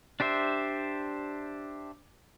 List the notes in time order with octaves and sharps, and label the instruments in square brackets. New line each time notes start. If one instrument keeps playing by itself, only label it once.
[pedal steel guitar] D4 G4 C5 E5